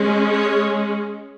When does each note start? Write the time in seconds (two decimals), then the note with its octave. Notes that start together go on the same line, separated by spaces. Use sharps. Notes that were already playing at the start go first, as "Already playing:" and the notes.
Already playing: G#3 C#4
0.30 C#5